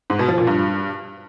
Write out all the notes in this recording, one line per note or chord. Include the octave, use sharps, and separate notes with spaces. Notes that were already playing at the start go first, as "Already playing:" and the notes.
G#2
B2
F3
A#2
G2